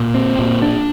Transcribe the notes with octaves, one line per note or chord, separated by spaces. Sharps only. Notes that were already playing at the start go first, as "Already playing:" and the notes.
Already playing: A#2
C4
A#2
D4